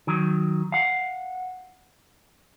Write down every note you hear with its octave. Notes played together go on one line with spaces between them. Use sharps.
D#3 F#3
F5 F#5